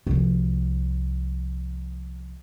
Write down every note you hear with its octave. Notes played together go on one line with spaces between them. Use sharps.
C2 F3